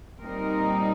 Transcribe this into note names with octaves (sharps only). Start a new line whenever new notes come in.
A#2 G3 C4 D#4 A#4